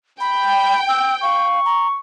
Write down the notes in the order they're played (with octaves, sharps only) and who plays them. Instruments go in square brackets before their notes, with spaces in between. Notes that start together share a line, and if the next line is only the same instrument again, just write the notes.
[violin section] G5 [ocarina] B5
[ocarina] E6
[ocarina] F5 [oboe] C#6
[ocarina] A#5